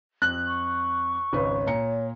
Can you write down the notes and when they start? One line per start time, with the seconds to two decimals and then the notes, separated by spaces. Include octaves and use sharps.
0.22 F2 F#6
0.46 C#6
1.33 G#1 C#2 B4 C#5
1.67 A#2 A#5 C#7